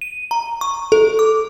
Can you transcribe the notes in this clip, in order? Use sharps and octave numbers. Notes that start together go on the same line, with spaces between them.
D#7
A#5
C#6
A4
D6